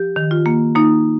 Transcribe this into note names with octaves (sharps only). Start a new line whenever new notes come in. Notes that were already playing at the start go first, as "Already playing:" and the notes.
Already playing: F3 G4
D#3
F4
A#3
A#3 D#4